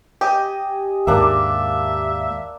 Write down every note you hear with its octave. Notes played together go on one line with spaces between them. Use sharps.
G4 D#5 G#5
D#2 G#2 A#3 D4 E5 E6